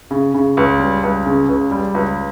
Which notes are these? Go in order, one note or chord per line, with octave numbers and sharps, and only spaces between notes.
C#3
C#3
C#2
G3
C#2
C#3
C#2
G3
C#2